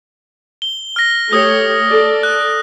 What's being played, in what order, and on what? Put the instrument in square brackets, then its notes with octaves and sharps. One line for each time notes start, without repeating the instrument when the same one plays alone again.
[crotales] G7
F6 A#6
[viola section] A3 G4 C#5 [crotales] D#6 A#6
[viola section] A4 D5
[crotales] F#6